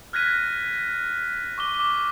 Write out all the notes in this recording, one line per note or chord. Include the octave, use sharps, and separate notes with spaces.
F6 F#6 G#6 A#6 B6 D#7
C#6 D6 G7
D6